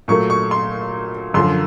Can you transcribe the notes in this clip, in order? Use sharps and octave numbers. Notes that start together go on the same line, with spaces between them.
A#2 F#3 A3 C#6
C#6
C6
F#2 D3 F3 C6